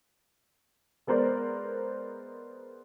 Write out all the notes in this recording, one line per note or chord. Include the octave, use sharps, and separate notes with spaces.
G#3 B3 A#4 C5 D5